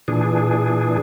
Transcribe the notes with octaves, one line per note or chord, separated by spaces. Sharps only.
A#2 E3 D4 G#4